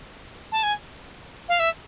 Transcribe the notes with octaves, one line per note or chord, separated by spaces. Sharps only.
A5
G#5
F5
E5